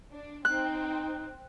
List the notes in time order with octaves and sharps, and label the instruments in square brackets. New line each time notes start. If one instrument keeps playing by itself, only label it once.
[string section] D4
[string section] C4 [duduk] D#4 [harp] F#6